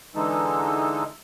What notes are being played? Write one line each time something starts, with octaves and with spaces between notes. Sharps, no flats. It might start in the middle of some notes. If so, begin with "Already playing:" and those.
D3 E3 G#3 D#4 A4